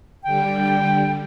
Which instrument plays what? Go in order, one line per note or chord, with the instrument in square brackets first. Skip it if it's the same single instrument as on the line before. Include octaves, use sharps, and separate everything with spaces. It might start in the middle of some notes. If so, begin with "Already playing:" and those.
[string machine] D3 G3 [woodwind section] G5